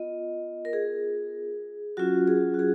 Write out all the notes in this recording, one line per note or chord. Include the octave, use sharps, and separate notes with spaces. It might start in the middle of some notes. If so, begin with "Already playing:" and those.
Already playing: B3 F4 D#5
A#4
G#4
F#3 C#4 F4 F#4
G#4
F#4
G#4